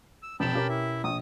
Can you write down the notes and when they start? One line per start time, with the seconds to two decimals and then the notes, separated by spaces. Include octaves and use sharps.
0.22 E6
0.40 F1 F2 B2 G5 A5 B5 E7
0.53 C#4 G4 A#4
0.69 E4 E5
1.04 A#1 D#6